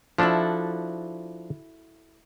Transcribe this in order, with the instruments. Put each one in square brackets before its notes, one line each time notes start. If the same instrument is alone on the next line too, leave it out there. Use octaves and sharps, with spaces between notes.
[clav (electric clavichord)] F3 D4 [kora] E4 F#4 A4